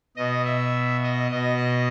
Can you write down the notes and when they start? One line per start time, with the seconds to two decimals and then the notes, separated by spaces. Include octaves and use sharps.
0.16 B2 D#5
0.45 E5
1.03 D#5
1.31 B2 D#5